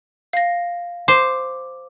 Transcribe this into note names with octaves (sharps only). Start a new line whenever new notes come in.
F5 A#6
C5 D6